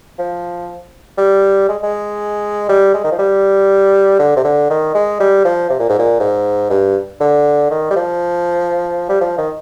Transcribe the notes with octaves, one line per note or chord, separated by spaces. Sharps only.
F3
G3
G#3
G#3
G3
G#3
D#3
F3
G3
D3
C3
D3
D#3
G#3
G3
F3
C3
A#2
G#2
A#2
G#2
G2
D3
D#3
G3
F3
G3
F3
D#3